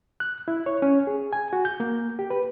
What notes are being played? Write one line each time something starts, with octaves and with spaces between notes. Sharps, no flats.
F#6
E4
C#5
C#4
G#4
G#5
F#4
G6
A#3
G4
B4